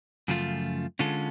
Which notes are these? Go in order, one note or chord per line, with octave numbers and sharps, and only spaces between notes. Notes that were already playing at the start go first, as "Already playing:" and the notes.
F#2 C#3 F3 A3 F4
D3 G#3 C#4 F4 A4